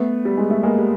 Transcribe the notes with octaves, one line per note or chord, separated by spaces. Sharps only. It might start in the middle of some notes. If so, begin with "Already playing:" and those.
Already playing: A3 B3
G3
G#3
A3
G#3 A#3
G3